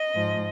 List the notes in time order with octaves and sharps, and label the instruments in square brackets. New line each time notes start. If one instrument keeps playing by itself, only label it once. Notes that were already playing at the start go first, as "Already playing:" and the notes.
Already playing: [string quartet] D#5
G#2 F3